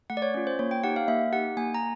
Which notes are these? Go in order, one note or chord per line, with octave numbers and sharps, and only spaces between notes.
A3 F#5
D5
C#5
C#4 F4 C#5
C5
A#3 C#5
G5
D#4 G4 F#5
F5
A#3 E5
D#4 G4 F#5
A#3 G#5
A#5